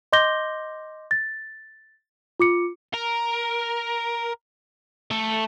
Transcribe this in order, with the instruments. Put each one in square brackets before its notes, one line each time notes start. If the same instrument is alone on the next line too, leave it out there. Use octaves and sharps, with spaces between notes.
[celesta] D#5 C6 D6 G6 A#6 G7
A6
F4 D6 C#7
[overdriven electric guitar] A#4
A3 A4